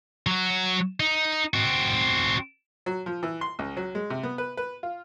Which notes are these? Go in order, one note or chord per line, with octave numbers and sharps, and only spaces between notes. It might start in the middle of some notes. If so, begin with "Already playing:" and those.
F#3 F#4
D#4
C4 F#4
F#3
F3
E3
C6
C#2
F#3
G#3
C3
B3
B4
B4
F4